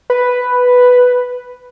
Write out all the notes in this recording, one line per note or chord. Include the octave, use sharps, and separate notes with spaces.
B4